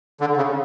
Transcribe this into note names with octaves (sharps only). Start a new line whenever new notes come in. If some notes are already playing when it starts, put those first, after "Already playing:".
D3
C#3